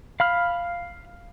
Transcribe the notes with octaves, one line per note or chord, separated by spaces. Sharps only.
F5 B5 F6